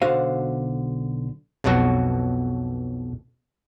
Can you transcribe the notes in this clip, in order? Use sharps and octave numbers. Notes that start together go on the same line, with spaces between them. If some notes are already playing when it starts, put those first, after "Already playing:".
B1 D3 F#4 C5 F5
B1 F2 B2 F#3 F#4